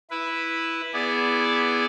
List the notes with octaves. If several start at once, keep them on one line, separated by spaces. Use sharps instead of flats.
E4 B4
B3 E4 G#4 D5